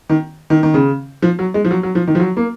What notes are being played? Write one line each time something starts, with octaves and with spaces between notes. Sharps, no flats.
D#3
D#3
D#3
C#3
F3
F#3
G#3
F3
F#3
F#3
F3
D#3
F3
F#3
A#3